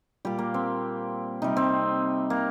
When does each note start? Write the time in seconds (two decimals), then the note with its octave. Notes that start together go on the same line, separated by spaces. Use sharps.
0.25 A#2 G3 G4
0.39 A#3
0.54 C4
1.42 C3 G3 D#4
1.57 C4
2.30 A#3